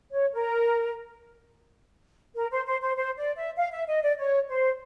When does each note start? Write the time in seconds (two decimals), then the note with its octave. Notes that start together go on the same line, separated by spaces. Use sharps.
0.12 C#5
0.33 A#4
2.35 A#4
2.50 C5
2.66 C5
2.81 C5
2.96 C5
3.17 D5
3.36 E5
3.57 F5
3.72 E5
3.88 D#5
4.02 D5
4.18 C#5
4.49 C5